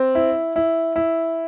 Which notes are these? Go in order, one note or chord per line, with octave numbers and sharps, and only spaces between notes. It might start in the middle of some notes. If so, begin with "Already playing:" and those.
Already playing: C4
E4
E4
E4